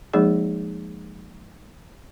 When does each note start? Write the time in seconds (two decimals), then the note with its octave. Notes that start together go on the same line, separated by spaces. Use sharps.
0.13 F3 G#3 A#3 D#4 G#4 D5